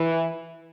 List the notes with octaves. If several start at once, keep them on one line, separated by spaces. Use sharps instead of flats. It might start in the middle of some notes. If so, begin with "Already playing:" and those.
Already playing: E3